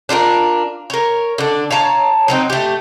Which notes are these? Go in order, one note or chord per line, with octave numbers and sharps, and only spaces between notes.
D4 F4 G4 A#4
A#4 C#5
D3 D4
C#5 F5 A5 A#5
F#3 C4 D#4
A3 G4